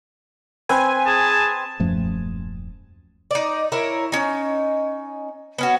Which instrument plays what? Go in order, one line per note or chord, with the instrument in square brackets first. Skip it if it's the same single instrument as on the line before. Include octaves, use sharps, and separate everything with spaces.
[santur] C4 B4 C6 [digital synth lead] G#5
[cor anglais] G#4 [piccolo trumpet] A5
[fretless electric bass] D#1 F#2 F3 A3
[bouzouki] D#4 D5
E4 A#4 C#5
C#4 D#4
B3 C#4 F#4